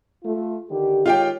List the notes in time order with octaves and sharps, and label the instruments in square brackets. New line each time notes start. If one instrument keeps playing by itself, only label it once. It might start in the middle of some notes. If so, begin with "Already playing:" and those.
[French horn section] A3 F4
D3 D#3 G4
[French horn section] D#3 G#3 C#5 [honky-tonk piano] F4 G4 G5